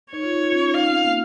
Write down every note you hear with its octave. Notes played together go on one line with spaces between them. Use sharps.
D#4 C#5
F4
D#4
F4
C#4
D#4
D#4 F5
C4
A#3